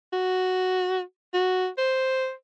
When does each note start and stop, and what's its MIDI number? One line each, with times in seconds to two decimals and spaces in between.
0.13 1.00 66
1.34 1.68 66
1.78 2.31 72